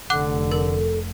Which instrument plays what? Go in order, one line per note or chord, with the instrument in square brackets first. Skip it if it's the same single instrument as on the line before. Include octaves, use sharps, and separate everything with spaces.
[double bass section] F1 [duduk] D3 [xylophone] F#5 D6 F#6
[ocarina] A4 [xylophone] A#4